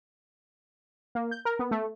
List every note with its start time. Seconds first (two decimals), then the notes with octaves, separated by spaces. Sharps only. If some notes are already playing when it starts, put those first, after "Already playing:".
1.15 A#3
1.31 G6
1.45 A#4
1.59 B3
1.71 A3